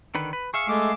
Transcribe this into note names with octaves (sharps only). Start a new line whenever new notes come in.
D3 D#3 B4
B4
G#4 E5 F5 C#6
G#3 A3 D6